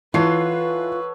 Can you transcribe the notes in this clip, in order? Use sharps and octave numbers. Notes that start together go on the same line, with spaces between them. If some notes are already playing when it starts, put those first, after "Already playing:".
E3 F4 A4 B4 C#5 F#5 C7